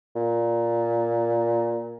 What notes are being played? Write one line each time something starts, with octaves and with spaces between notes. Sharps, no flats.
A#2